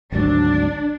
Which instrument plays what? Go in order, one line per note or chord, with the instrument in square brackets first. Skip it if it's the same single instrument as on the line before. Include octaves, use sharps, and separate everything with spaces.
[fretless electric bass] G#1 D2 F#3 [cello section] D4